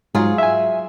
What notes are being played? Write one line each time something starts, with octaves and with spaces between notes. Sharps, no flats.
G#2 F#3 F4 G#4
E5 G#5